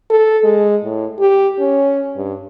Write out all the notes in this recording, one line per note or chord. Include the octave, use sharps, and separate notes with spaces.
A4
G#3
A2
G4
C#4
G2